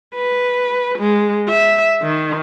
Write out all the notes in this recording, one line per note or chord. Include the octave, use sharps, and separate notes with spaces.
B4
G#3
E5
D#3